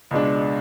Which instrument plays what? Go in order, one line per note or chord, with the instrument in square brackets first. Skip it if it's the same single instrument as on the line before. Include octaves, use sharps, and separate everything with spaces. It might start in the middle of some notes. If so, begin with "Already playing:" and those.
[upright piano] C#2 B2 G#3 D4